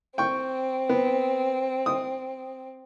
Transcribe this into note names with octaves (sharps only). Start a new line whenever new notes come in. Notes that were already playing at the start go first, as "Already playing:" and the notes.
C4 G5 C#6
B3
D#6